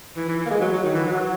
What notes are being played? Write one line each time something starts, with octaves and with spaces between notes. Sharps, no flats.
E3
E3
E3
A#3
G#3
F#3
F#3
D#3
E3
F#3